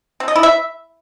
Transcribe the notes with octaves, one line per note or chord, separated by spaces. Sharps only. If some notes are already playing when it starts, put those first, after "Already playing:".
C4
D#5
E4
E5